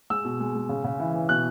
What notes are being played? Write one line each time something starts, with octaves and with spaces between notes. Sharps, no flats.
G#3 E6
B2
G#3
G#3
C#3
C#3
E3
E3
B2 F#6